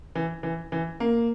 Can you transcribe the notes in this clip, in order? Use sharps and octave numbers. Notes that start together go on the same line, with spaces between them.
E3
E3
E3
A#3